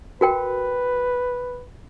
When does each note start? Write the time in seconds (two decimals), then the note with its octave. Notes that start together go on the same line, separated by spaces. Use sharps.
0.21 F#4 A#4 B4 G5